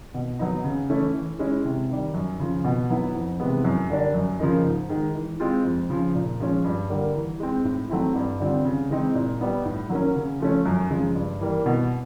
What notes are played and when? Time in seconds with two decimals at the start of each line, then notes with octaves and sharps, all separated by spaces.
0.14 B2
0.39 F#3 B3 D#4
0.64 C#3
0.89 E3 A3 C#4 E4
1.14 E3
1.39 G#3 C#4 E4
1.65 C3
1.90 D#3 G3
2.14 F#2
2.39 C#3 F3
2.64 B2
2.90 F#3 B3 E4
3.14 F2
3.40 C3 E3 G#3 B3
3.65 F#2
3.90 D3 G3 A#3 D4
4.14 F#2
4.39 C#3 F3 A#3 D#4
4.65 G#2
4.89 D#3 G#3
5.15 E3
5.40 G#3 C4 F4
5.64 F2
5.90 C#3 F3
6.15 A#2
6.40 F3 G#3 C#4
6.64 G2
6.90 D3 G3 A#3
7.15 E3
7.40 G#3 C4
7.65 A2
7.90 F#3 A3 C4 E4
8.15 G2
8.40 D3 G3 C4 F4
8.65 C#3
8.90 E3 G#3 C4 D#4
9.15 A#2
9.40 G3 B3 D#4
9.65 A2
9.90 F#3 A#3 C#4
10.16 C#3
10.40 F3 A3 C#4
10.66 F#2
10.90 C#3 F3 G#3
11.15 G2
11.41 E3 G3 A#3
11.66 B2